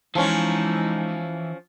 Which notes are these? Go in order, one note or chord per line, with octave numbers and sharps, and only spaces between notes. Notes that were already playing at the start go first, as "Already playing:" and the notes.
E3 F3 G#3 C#4 D#4